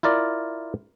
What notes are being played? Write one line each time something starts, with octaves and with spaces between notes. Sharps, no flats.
E4 F4 A#4 D5